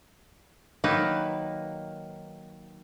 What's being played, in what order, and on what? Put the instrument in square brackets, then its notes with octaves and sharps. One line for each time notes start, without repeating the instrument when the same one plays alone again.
[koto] D#3 F#3 A#3 D#4 B4